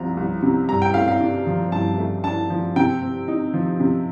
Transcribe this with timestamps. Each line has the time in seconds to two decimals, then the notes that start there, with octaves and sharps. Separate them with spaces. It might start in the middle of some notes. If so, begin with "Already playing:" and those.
Already playing: C2 C3 F3 A#5
0.17 C2
0.43 C3
0.68 G2 A#5
0.82 G5
0.94 A3 F5
1.08 F5
1.20 D4
1.47 F3
1.72 G2 A5
1.98 A3
2.24 D4 A5
2.50 F3
2.76 C3 G5
3.02 C4
3.28 D#4
3.54 F3
3.80 C3